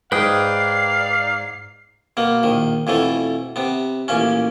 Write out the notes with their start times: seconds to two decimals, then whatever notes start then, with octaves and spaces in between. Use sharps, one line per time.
0.12 G#2 D#4 B4 D5 F5 G5 D#6 C7
2.17 B2 A#3
2.43 A#1 D#3
2.87 F2 B2 E3 A3
3.56 C3 B3
4.08 A1 A#2 C#4